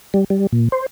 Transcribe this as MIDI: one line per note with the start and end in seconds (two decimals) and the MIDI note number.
0.14 0.24 55
0.30 0.47 55
0.52 0.69 46
0.72 0.86 72